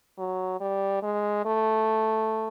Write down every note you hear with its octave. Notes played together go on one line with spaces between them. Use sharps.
F#3
G3
G#3
A3